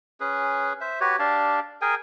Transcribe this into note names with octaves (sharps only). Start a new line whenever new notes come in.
C#4 G#4 B4
C5 E5
F#4 G4 B4 C#5
D4 G4 F5 A5
G#4 A#4 G5 G#5